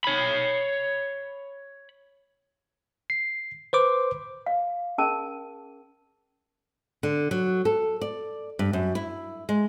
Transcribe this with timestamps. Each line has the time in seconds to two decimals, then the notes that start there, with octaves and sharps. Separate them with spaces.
0.04 C#5 B5
3.10 C7
3.73 B4 C5 D6
4.46 F5
4.98 C#4 G#4 A#4 A5
7.03 D3
7.31 F#3
7.65 A4
8.02 D5
8.59 G2
8.73 F#2
8.95 E4
9.49 G#3